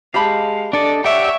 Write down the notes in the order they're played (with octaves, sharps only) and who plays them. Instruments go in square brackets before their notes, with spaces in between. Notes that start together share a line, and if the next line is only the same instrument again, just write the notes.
[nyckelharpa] G#3 [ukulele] G4 A5 B5 [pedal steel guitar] F5
[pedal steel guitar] D4 A4 D#5 [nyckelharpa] D5
[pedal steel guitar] G4 D5 F#5 [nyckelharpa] C#5 [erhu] E5